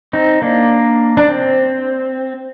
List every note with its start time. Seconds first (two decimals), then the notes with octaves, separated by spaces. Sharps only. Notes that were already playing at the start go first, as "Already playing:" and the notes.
0.13 C4 D#4
0.42 A#3 D4
1.17 D4
1.29 C4